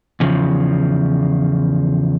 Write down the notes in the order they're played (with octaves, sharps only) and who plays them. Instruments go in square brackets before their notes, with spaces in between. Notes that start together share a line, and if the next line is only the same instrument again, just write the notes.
[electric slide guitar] E2 C#3 F3